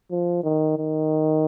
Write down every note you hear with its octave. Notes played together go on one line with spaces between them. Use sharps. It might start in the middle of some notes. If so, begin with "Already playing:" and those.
F3
D#3
D#3